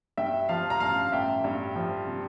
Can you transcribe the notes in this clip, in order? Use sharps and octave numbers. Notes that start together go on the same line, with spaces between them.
G2 E5 G5
F3 F5 A5
A#5
A1 F5 A5
A1 E5 G5
G2
F3
C3